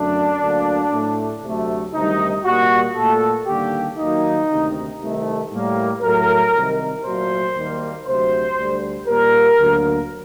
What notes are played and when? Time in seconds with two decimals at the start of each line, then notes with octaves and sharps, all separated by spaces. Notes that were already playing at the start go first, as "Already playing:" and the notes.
Already playing: F#2 D3 F#3 A3 D4
0.41 D2 D3 F#3 A#3
0.92 A2 A3
1.43 D2 C3 F#3 A3
1.93 D2 C3 D#3 G3 D#4
2.45 A#2 G3 A#3 F#4
2.96 A#2 A3 A4
3.47 D#2 D3 G3 A#3 G4
3.98 D#2 D#3 F#3 A#3 D#4
4.49 D2 C3 D#3
5.00 C2 C3 D#3 A3
5.51 A2 G3 A#3
6.02 A2 F#3 A3 A#4
6.53 C2 C3 D#3
7.04 A#2 F#3 A3 C5
7.55 D#2 D#3 G3 A#3
8.06 D2 C3 F#3 C5
8.57 D2 D3 G3
9.08 A#2 G3 A#3 A#4
9.59 D2 D3 F#3 A#3